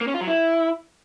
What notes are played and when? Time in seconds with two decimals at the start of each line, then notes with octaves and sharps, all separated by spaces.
0.01 A#3
0.08 C#4
0.14 F4
0.21 F#3
0.27 E4